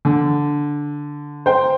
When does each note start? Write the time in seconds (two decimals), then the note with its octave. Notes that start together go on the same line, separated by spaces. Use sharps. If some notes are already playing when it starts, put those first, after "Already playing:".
0.05 D3
1.46 C5 G5